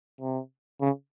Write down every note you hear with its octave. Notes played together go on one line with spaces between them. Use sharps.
C3
C#3